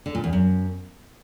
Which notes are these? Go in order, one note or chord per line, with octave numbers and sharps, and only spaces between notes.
D3
A#2
E2
F#2